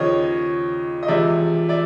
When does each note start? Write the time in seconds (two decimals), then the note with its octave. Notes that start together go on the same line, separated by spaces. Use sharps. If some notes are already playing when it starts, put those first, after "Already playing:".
Already playing: D#2 C#3 F3 C#5 D#5
1.03 D#5
1.08 E2 C3 F3 G#3 D5 E5
1.69 D5 E5